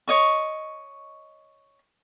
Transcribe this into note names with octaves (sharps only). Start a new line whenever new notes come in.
C#5 D#5 C#6